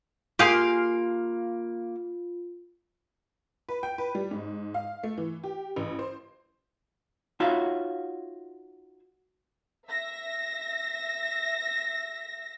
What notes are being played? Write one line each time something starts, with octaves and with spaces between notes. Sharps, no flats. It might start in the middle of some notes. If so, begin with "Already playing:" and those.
A#3 F4 G4 G#4 F5 G#5 C6
B4
G5
B4
G3
G#2
F5
A3
E3
G4
A1
C5
D#4 F4 F#4 C#5 E5 F5
E5 A#6